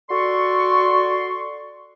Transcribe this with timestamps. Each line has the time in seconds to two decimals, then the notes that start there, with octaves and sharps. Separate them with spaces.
0.10 F#4 A4 D5 C6 C#6